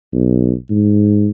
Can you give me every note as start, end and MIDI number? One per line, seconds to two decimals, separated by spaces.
0.13 0.54 35
0.70 1.30 44